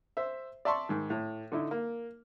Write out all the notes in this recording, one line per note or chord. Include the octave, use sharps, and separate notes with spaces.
C5 E5
D5 E5 A5 C6 C#6
G#2 D#3
A2
D3 D#4 E4
A#3